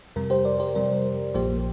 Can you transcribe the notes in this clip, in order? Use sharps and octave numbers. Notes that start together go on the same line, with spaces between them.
F2 C3 G3 A#4
G4 C5
A#4 D5
G4 C5
F2 C3 G3 A#4
A#1 A#2 F3 A#3 G4 C5